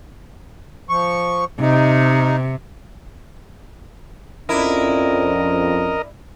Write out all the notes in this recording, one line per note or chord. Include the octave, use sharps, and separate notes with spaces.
F3 C#6
C3 D#4
F2 C#4 D4 E4 A#4 D#5